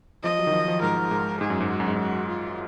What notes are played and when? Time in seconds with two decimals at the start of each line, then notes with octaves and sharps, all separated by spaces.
0.23 F3 D#5
0.39 F#3
0.47 D#3
0.53 F3
0.68 F3
0.82 G#2 A#4
0.97 G#2
1.11 G#2
1.40 G#2 G#4
1.50 F#2
1.60 G#2
1.69 F#4
1.80 F#2
1.88 G#2
1.95 F#2 F#4
2.28 F4